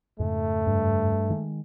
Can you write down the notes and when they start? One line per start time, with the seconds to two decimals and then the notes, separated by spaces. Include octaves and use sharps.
0.20 F2 G#2 C#3 A3
0.67 G2
1.30 D#3 G#3